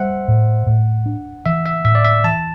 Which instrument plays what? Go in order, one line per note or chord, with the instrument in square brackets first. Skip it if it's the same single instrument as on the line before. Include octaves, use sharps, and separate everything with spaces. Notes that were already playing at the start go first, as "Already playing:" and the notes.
Already playing: [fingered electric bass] G3 [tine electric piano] C5 E5 F#5
[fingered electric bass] A2
A2
D4
[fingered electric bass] E3 [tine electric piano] E5
[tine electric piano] E5
[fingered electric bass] A2 [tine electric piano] E5
[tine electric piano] D5
E5
[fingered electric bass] E3 [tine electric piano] A5